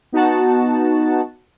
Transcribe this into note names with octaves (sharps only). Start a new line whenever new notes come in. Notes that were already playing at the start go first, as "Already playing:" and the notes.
B3 D#4 F#4 F#5 A5